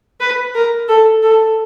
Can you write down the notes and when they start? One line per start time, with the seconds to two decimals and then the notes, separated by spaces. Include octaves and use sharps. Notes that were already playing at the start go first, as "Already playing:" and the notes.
0.20 B4
0.55 A#4
0.88 A4
1.23 A4